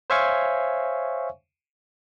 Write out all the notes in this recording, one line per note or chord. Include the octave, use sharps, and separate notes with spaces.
C5 C#5 E5 F5 G#5 C#6